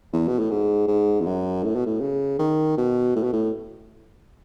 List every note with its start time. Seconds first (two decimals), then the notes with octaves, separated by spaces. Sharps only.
0.13 E2
0.28 B2
0.39 A2
0.51 G#2
0.87 G#2
1.21 E2
1.26 F#2
1.63 A2
1.75 B2
1.86 A2
2.01 C#3
2.39 D#3
2.77 B2
3.15 A2
3.23 B2
3.33 A2